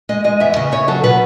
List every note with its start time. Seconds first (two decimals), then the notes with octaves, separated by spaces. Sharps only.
0.09 G#3 D#5
0.24 G#3 D#5
0.40 E2 E5
0.56 C#3 D#5
0.72 C#3 C#5
0.88 F#3 A4
1.03 B2 B4